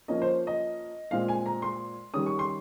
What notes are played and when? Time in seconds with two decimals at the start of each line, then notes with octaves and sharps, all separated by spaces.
0.08 F3 A#3 C#4 D#5
0.22 C5
0.47 D#5
1.11 A#2 G#3 C4 F5
1.29 G#5
1.46 A#5
1.62 C6
2.14 D#3 G3 C#4 D#6
2.26 C#6
2.39 C6